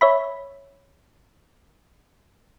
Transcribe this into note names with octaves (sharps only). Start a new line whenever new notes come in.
C#5 E5 B5